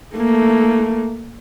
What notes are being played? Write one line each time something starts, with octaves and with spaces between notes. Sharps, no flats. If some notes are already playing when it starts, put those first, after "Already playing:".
A3 A#3